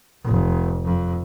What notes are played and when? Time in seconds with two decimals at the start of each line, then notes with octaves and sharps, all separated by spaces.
0.25 F1
0.84 F2